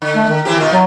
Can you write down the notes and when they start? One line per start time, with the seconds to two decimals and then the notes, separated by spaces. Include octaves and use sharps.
0.02 D3
0.15 A3
0.29 D#3
0.45 E3 C4 G4
0.60 B2 D#3 F4
0.73 F#3